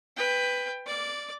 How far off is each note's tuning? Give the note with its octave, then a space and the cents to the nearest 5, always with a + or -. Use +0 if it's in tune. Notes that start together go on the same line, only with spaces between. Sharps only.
B4 +10 G5 +20
D5 +0 D6 -15